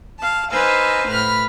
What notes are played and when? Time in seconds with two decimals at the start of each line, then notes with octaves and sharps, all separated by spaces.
0.19 F5 A5
0.51 D#4 B4 C5 F5 G#5 E6
1.09 A2 B4 B5 F6